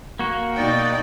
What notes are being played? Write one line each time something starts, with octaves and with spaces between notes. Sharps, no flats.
A#3 F#4
B2 D#4 D5 G5